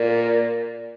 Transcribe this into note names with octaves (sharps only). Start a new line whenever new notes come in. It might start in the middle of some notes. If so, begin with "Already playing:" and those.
Already playing: A#2